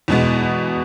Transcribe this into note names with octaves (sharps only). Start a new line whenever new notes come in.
E2 B2 G#3 B3